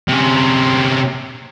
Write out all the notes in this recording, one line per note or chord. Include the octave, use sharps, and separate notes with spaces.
C3 C#4